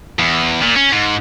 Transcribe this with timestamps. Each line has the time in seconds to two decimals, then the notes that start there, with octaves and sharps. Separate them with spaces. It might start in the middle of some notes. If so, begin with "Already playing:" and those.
0.19 E2
0.62 A#2
0.76 C#4
0.92 G#2